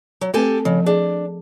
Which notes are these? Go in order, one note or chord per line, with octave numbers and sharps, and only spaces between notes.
F#3
A3 C4 G4 A4 B4 G#5
C#3 F3
D4 G#4